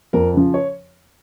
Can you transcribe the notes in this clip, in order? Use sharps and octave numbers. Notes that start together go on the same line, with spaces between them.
F2 A#4
C#3 F3
C#5